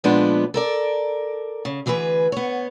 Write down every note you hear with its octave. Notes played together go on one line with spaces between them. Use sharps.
A#2 F3 G#3 B3 D4 B4
A4 A#4 D5
C#3
D2 E3 G#4 A#4 B4
B3 C#5